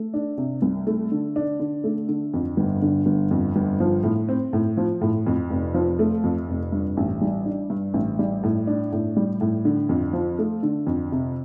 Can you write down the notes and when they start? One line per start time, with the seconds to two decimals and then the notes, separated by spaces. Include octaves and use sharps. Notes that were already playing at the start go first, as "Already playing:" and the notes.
Already playing: A3
0.14 D4
0.38 C3
0.62 C2
0.87 A3
1.12 D3
1.36 D4
1.60 D3
1.84 A3
2.08 D3
2.34 F2
2.57 G1
2.82 D3
3.06 G1
3.31 F2
3.56 G1
3.80 F3
4.03 A2
4.29 C4
4.53 A2
4.77 F3
5.01 A2
5.27 F2
5.50 F1
5.74 F3
5.99 A3
6.24 F2
6.48 F1
6.72 G2
6.97 A1
7.21 G3
7.45 D4
7.70 G2
7.94 A1
8.19 G3
8.43 A2
8.67 D4
8.92 A2
9.17 G3
9.41 A2
9.65 D3
9.89 F2
10.13 F3
10.39 A3
10.63 D3
10.87 F2
11.12 C3